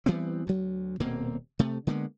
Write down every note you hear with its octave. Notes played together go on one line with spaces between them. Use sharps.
E3 G3 B3 C4
D2 F#3
D#1 B2 A#3 C4
C3 A3
D3 G#3 A#3 B3